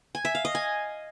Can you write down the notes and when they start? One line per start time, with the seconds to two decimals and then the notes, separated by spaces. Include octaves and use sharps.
0.15 G#5
0.25 E5
0.35 F5
0.45 D#5
0.55 G#5